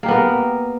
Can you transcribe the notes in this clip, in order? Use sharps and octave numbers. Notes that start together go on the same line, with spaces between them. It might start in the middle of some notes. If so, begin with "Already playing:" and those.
A#3 B3 G4 A#4